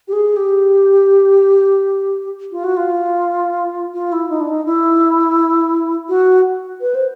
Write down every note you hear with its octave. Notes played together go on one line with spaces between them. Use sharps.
G4
G#4
G4
F4
F#4
F4
F4
E4
D#4
D4
D#4
E4
F#4
B4
C5